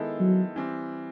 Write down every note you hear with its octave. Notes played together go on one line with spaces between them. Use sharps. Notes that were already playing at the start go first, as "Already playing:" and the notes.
Already playing: D#3 G#3 B3 E4 A4
F#3
E3 G3 C4